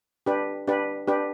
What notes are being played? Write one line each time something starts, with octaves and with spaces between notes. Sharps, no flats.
D4 G4 B4
D4 G4 B4
D4 G4 B4